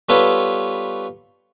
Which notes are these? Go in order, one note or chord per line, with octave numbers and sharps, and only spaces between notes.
G3 B3 F4 A4 B4 C#5